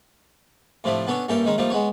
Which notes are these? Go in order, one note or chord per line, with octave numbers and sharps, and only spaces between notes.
A2 C3 F3 A3 D4 E4
B3 C#4 D4 A4 C#5
G2 A#3 C#4 A4 E5 G5
D#3 G#3 C#4 D#4
F3 G3 A3 A#3 D#4
G#3 B3 C#5